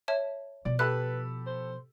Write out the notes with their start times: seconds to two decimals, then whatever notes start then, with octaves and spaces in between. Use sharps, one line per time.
0.08 C#5 E5 A5
0.65 B2 F3 D5
0.79 G4 A4 B4 B5 F#6
1.47 C5